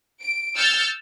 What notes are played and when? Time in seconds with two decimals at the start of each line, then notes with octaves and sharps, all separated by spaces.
0.22 D7
0.56 E6 F6 G6 A6 C#7